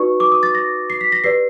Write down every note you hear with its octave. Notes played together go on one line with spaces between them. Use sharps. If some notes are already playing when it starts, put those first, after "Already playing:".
Already playing: D#4 F#4 B4 D5 C#6
D6
D#6
A6
A#6
C7
B6
A#6
G4 B4 D5 C7